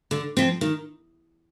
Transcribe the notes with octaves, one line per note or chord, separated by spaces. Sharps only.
D3
F3 C4
D#3